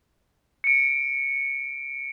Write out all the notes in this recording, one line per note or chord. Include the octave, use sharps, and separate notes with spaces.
C#7 D7